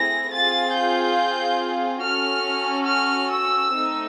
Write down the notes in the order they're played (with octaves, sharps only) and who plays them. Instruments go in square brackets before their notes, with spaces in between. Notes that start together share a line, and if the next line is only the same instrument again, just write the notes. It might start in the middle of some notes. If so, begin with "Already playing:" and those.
Already playing: [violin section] A3 C4 E4 G#4 A#6
C4 F4 G#4 A6
G6
C#4 F#4 A4 F6
F6
E6
A3 C4 D#4